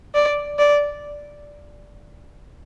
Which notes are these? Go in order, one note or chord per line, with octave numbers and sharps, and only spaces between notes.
D5
D5